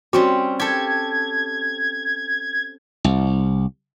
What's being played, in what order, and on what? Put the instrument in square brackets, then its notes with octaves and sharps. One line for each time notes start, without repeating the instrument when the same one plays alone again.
[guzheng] G3 C4 C#4 [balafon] F#4
[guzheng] G4 A4 [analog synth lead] G#6
[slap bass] C2